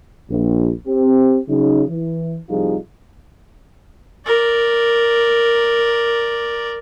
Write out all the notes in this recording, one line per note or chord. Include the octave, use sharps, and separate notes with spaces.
A#1
C4 G4
C#3 F#3 D#4
E3
C2 F3 G3 D#4 F4 G#4
A#4 D5